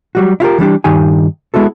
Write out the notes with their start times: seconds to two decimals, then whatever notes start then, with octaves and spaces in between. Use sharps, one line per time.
0.15 F#3 G3 F#4
0.40 E4 F4 G4 A#4
0.58 E3 G3 D4 G4
0.84 G2 D#3 D#4 G4 G#5
1.54 G#3 B3 E4 F#4 A4